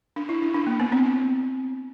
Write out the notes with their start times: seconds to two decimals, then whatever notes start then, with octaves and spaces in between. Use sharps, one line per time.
0.16 D4
0.29 E4
0.42 D4
0.54 D4
0.67 A#3
0.80 B3
0.92 C4